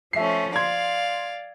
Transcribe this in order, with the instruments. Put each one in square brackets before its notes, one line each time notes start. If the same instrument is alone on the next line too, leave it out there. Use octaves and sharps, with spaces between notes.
[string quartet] F3 A3 C#4 [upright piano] E5 C7
[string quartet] D5 F5 [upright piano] C6 G#6